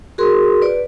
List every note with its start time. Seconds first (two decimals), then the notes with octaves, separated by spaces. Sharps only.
0.18 F#4 G#4 A#4 C6
0.62 B4 D5